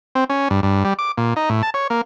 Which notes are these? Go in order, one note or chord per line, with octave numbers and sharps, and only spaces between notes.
C4
C#4
G2
G2
G3
D6
A#2
D#4
A2
A5
C#5
A#3